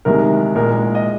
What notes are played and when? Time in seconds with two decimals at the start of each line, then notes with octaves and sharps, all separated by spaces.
0.05 C2 C3 D#3 G#3 A#4
0.54 A#1 A#2 G#3 A#4
0.95 D#5